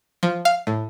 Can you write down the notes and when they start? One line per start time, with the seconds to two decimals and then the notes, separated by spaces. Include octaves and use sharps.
0.23 F3
0.45 F5
0.67 A2